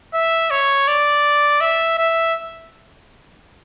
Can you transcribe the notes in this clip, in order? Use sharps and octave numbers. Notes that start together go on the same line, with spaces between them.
E5
C#5
D5
E5
E5